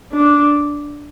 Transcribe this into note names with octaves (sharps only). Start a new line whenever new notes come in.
D4